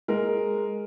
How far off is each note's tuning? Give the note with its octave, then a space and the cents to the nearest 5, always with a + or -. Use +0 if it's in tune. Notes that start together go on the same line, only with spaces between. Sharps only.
G#3 +0 A#4 +0